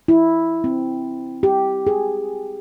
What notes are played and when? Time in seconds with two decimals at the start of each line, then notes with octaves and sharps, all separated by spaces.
0.08 E4
0.64 C4
1.43 G4
1.87 G#4